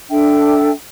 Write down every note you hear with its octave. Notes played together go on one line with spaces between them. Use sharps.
D4 A4 E5 G5